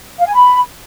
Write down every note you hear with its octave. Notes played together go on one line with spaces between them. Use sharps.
F5
G#5
B5